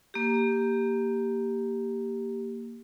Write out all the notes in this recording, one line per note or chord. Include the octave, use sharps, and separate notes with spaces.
A#3 G4